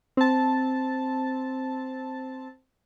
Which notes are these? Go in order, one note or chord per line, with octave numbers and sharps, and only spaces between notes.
C4 A5